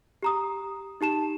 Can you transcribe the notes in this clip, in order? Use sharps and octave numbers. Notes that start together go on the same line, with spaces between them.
G4 A#5 D#6
D#4 G4 A5 E7